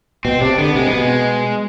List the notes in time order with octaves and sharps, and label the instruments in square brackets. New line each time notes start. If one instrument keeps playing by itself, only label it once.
[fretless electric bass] B2 [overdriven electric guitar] C4
[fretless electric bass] C3 [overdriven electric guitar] D4
[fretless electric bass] D3 [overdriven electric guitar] B3
[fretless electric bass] C3 [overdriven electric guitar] G#3
[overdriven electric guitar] B3
[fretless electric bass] B2 [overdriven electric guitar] G#3